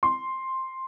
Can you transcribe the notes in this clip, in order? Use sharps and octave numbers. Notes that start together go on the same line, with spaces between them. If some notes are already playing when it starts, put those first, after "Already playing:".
C6